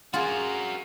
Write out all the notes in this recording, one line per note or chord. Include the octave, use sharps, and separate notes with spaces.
F4 F#4 G#4 A#4